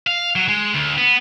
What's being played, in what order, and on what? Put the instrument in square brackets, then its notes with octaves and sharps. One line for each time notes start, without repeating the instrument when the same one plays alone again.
[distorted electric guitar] F5
F#3
G#3
D2
B3